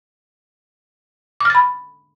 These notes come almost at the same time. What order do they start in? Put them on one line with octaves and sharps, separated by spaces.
D6 F6 A6 B5